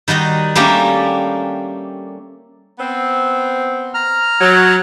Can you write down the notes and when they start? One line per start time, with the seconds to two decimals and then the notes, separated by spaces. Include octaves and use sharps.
0.08 D#3 G3 F#4 D#5
0.55 G3 A3 A#3 C#4 D4 G4
2.79 B3 C4
3.94 A#5 F6
4.40 F#3